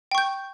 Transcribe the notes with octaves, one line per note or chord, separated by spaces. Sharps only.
G5 C#6 G6